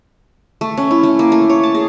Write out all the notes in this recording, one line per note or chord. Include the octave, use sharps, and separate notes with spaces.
A3
C#4
E4
A3
A#3
A3
C#5
A5
G#4